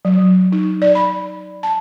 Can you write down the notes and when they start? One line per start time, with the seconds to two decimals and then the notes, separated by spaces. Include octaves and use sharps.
0.05 F#3
0.52 D#4
0.82 D5
0.95 B5
1.63 A5